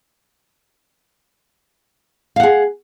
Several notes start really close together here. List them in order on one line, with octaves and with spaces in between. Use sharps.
F5 F#5 G#4